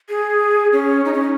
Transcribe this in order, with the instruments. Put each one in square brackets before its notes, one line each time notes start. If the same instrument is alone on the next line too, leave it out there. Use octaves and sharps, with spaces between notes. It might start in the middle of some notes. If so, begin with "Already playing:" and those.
[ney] G#4
C#4
D#4
C#4